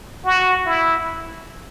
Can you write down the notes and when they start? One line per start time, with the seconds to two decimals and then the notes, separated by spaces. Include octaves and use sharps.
0.25 F#4
0.66 E4